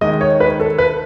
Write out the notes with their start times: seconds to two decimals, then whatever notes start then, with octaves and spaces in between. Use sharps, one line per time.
0.01 D#3 G#3 D#5
0.21 C#5
0.40 B4
0.60 A4
0.78 B4